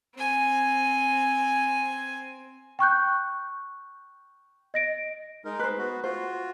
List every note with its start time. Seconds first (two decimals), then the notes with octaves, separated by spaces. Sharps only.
0.15 C4 G#5
2.79 G5 C#6 F#6 G6
4.74 D#5 A#6 D7
5.45 G#3 D#4 A#4
5.59 B4 C5
5.78 B3 F#4
6.04 F4 F#4 C5